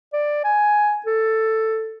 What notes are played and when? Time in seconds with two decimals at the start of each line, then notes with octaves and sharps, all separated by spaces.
0.13 D5
0.44 G#5
1.06 A4